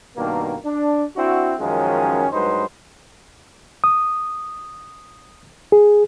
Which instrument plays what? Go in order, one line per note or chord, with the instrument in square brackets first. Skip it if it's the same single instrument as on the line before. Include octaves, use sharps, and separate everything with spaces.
[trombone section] G2 B2 D#3 A#3
D4
C4 D4 E4 F#4
F#2 D#3 F3 G#3 C#4
G2 F#3 G#3 D#4 B4 C5
[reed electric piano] D#6
G#4